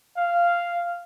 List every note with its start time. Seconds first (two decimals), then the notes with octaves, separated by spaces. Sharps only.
0.17 F5